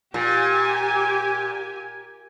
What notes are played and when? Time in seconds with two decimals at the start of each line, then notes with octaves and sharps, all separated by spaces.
0.14 A#2 G4 G#5